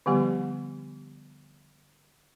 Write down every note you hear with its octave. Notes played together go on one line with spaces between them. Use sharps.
D3 F3 G3 B3 G4